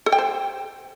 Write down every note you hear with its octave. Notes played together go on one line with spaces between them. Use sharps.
A4
G5
C5